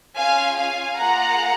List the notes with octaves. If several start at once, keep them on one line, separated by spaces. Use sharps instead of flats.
C#4 F4 G#4 F5 G#5
F5 G#5
A#3 F4 G#4 F#5 A#5